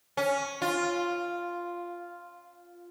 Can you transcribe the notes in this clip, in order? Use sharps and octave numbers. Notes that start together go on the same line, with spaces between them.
C#4
F4